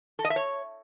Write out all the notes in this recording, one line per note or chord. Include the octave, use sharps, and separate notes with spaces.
A4
D#5
E5
C#5